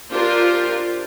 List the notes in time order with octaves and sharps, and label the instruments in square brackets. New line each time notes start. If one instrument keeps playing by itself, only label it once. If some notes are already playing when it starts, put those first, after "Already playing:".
[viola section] D4 F4 G4 A#4 C5